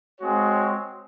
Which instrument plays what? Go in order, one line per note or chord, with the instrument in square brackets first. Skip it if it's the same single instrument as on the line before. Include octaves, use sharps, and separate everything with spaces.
[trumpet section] G#3 C4 F#4 C#5